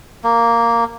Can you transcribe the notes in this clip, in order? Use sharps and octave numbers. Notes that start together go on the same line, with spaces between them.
A#3